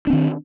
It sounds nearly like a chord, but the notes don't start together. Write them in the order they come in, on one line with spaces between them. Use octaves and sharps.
D4 C4 D#3